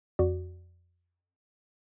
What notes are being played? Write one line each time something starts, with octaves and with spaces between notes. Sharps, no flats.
F2 F#4 D5